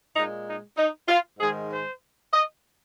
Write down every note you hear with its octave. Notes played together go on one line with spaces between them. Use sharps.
A#2 G#3 D#4
D#4
D#4
F4
G#2 D#3 G#3 G#4
C5
D#5